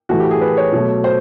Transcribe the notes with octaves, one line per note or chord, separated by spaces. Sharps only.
A2 E3 A3 F#4
G4
G#4
B4
C#5
B2 F#3 A3
C5